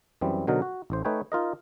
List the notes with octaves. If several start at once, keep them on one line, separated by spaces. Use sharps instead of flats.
F#2 E3 G3 C4
B2 D3 F#3 D#4 A#4
F#4
A1 A2 C5
A3 D#4 B4 C#5 G5 G#5
D#4 F4 A#4 D#5